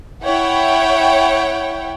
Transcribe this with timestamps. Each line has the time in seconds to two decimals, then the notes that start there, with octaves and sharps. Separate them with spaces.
0.24 E4 C#5 F#5 G5